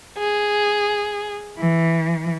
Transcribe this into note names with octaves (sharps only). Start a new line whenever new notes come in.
G#4
E3